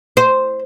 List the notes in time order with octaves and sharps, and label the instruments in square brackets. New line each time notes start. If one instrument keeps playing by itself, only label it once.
[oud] C5